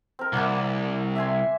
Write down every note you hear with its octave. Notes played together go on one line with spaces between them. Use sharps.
C4 A#4
C2 A#3 F#5 D6
E5 G#5 C6